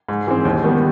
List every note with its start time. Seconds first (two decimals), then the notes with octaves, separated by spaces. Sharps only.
0.09 G#2
0.27 E3 G#3 C4
0.45 D#2
0.63 D#3 G3 B3